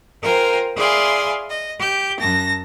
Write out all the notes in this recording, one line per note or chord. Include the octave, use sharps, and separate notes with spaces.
F4 A#4 C5 G5 G#5
E4 G#4 D5 F5 G#5 C6
D#5
G4 G6
F#2 A5 A#6